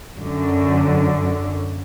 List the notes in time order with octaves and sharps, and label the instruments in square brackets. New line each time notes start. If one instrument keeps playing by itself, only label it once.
[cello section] F#2 D3